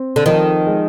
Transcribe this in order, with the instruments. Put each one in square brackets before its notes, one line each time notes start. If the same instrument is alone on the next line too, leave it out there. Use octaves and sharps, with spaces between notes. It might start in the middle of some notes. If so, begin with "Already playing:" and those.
Already playing: [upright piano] C4
[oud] D3
[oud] D#3 [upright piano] F3
[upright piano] G#3